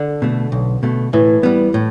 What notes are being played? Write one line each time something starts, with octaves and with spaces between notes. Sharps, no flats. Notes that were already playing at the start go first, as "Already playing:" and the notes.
Already playing: D3
B2 A3
B1
B2 A3
A2 E3
G3 B3
A2